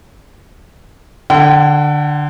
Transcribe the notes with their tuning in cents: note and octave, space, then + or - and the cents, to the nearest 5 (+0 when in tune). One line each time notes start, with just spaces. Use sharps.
D3 +5 G5 -40